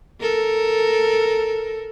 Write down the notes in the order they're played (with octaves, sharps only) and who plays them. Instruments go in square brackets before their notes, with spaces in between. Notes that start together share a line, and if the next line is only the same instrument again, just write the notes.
[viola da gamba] A4 A#4